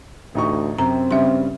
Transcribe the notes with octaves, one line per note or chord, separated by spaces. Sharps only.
A1 D2 D#4 C#6
F#2 C3 C4 A#5
G2 C#3 G3 E5 C6